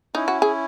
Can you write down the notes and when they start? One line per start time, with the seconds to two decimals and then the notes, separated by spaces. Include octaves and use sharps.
0.15 C#4 D#4 E4
0.28 F#4
0.42 G#4